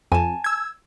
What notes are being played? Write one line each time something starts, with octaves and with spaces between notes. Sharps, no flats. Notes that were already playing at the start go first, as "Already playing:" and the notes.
F2 G#5 A5
E6 G#6